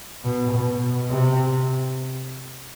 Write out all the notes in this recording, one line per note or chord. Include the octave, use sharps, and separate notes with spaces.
B2
B2
C3